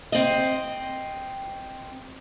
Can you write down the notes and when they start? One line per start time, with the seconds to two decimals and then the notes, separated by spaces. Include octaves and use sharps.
0.12 C4 D#5